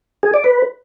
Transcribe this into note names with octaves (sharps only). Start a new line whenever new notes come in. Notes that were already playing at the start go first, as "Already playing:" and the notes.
G#4
D5
B4